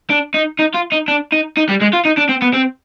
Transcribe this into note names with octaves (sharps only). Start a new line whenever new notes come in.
D4
D#4
D#4
F4
D#4
D4
D#4
D#4
G3
G#3
F4
D#4
D4
C4
B3
C4